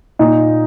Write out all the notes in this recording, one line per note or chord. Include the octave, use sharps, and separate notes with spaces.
A#2 D#4